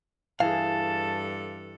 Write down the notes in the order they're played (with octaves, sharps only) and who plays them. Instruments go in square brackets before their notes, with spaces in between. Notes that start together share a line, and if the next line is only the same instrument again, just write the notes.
[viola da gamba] G2 A4 [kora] E3 G#4 [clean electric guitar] F5 [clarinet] A5